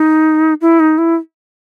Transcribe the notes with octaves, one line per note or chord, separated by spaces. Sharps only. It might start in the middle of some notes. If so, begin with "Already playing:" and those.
Already playing: D#4
E4
D#4
E4